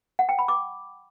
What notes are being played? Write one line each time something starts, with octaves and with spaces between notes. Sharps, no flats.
F#5
G5
B5
D6